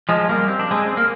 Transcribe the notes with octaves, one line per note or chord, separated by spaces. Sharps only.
F3 G#3
G3 A#3
C4
D4
G#3 C4
C4
A#3